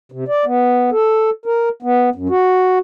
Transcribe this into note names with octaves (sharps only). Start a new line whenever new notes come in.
C3
D5
B3
A4
A#4
B3
F#2
F#4